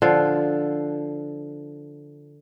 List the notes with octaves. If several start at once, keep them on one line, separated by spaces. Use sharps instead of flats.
D3 F3